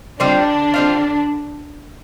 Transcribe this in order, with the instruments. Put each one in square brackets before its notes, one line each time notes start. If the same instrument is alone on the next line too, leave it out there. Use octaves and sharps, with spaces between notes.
[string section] D3 D4 [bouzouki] G3 C4 F4
[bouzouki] G3 C4 F4